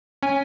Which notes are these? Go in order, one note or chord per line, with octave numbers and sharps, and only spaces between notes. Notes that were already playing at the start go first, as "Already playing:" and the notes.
C#4 G#5